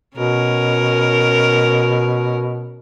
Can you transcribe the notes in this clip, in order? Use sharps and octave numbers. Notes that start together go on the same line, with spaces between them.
B2 C#4 A#4